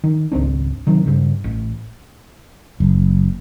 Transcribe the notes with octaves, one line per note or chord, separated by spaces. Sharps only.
D#3
G#1 C#2 C4 D4
C3 D#3 F#3
G2 C#3
A1
F#1